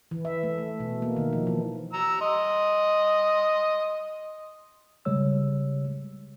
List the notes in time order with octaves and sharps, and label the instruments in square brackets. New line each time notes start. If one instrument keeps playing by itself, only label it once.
[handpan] E3
E5
A3
A3
B2
A#3
D#3
F3
E3
[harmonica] A#5 E6
D#5 C6
[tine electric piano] C#3 G3 G#3 C#5 E6